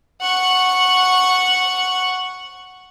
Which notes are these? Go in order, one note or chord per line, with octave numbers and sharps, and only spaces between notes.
F#5 C#6